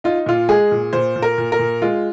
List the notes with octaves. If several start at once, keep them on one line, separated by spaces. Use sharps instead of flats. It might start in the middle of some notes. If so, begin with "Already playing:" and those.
D#4 F4
A#2 F4
G#3 G#4
A#2
A#2 C5
A#2
A#4
A#2
A#4
A#2
G#3 F4